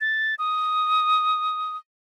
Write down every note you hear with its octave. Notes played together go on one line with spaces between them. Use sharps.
A6
D#6